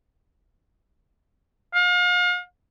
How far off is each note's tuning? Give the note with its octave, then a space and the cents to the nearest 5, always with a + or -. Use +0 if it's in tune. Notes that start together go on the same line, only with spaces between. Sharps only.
F5 +40